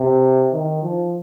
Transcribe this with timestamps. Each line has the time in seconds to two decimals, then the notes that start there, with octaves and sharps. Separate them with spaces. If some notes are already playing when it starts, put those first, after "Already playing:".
Already playing: C3
0.53 D#3
0.83 F3